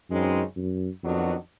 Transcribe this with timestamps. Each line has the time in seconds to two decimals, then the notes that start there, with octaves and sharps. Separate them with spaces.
0.10 F#2 C#3 E3 G#3 C4 D#4
0.56 F#2
1.03 F2 D#3 F#3 B3 D4 F#4